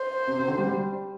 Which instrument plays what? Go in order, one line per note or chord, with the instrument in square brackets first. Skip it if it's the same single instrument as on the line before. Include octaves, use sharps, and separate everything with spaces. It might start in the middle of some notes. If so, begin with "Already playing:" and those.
Already playing: [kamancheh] C5
[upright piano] C3
C3
D3
G3
G3